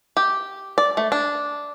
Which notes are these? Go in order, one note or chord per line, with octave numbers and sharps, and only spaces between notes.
G4
D5
A3
D4